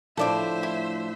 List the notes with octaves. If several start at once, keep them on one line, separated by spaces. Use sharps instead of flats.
A2 D3 F3 A4 C5 D5 E5
E4